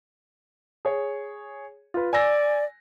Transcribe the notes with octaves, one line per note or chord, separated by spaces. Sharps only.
G#4 C#5
F4 B4
D5 G#5 E6 A#6